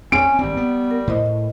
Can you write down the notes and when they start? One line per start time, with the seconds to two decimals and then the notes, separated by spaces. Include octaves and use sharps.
0.12 C4 C#4 D7
0.39 G#1 G3 C4
0.57 B3
0.91 A#4
1.07 A2 E4 C5 D#5